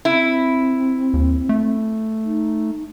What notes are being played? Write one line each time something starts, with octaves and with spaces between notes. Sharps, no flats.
C4 E4
D#2
A3
D#4